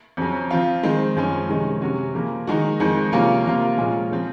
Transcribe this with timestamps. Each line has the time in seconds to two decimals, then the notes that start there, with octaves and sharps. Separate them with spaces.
0.17 F2 C#3 F#3 C#4
0.51 F3 C4 F4
0.83 D#3 G#3 C4
1.16 F#2 F3 G#3 C#4
1.49 C3 D#3 G#3 C#4
1.81 C3 F#3 C#4 F#4
2.14 C#3 F3 A#3
2.47 D#3 G#3 D#4 F#4
2.80 F2 D#3 G#3
3.12 C3 F#3 A#3 C#4 F4
3.46 C3 F3 A#3 F4
3.77 A#2 G#3 C#4 F4
4.11 C#3 F3 C4